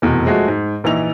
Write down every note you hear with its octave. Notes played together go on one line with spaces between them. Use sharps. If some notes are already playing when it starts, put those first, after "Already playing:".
F1 E2 B2
F3 G#3 A3 F#4
G#2
A#1 E3 D#4 E4 F7